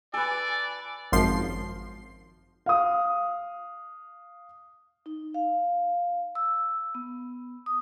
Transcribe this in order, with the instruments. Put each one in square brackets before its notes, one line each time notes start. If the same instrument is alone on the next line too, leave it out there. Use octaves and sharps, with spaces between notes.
[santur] A4 B4 [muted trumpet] D5 [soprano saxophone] G#5
[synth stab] G#1 F#2 F3 C6 C7
[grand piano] F5 D#6
[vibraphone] D#4
F5
E6
B3
D#6